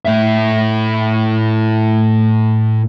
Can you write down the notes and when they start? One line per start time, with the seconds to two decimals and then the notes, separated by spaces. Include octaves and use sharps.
0.05 A2 E5